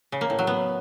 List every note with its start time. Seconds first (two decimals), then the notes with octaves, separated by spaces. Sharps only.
0.12 C#3
0.21 A#3
0.30 A2
0.39 F#3
0.47 B3